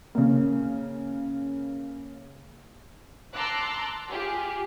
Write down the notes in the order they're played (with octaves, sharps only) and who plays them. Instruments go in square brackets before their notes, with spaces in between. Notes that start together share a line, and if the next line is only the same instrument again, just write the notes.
[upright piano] C#3 A#3
[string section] A5 A#5 C6 D6 E6 F#6
F4 G4 G#4